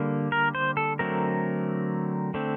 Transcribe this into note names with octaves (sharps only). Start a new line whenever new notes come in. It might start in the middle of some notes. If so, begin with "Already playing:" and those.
Already playing: D3 G3 A#3
A#4
C5
A4
D3 F#3 A3 C4 A#4
D3 A3 C4